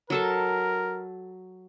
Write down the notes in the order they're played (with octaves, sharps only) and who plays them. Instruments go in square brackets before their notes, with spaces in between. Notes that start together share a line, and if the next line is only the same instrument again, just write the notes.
[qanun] F#3 A4 A5 [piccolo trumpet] A#4